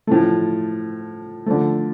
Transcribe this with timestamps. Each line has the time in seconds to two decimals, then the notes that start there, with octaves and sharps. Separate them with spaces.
0.07 A2 F3 A3
1.46 D3 F3 A3